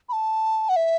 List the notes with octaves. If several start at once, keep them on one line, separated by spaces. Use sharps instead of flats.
B5
A5
F#5
E5